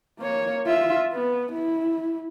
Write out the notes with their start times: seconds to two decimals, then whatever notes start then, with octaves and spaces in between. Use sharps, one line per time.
0.19 A#3 C#5
0.66 F4 E5
1.13 B3
1.52 E4